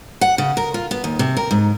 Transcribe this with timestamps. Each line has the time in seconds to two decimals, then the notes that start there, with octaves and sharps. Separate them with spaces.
0.21 F#5
0.38 C#3
0.57 A#4
0.74 F4
0.91 B3
1.04 D#2
1.19 C3
1.37 A#4
1.51 G#2